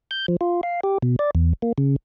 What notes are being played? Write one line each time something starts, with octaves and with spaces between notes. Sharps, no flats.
G6
F3
F4
F5
G4
B2
D5
E2
A#3
C#3